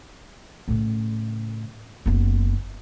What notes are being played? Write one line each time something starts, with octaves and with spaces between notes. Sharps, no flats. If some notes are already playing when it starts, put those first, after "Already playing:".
A2 C#3
F#1 B3